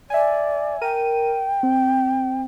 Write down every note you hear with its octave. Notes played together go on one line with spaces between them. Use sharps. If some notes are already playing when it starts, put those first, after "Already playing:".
D5 E5 G#5
A#4 G5 D#7
C4